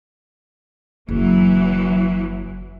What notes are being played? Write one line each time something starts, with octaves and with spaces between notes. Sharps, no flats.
F#1 E3 F#3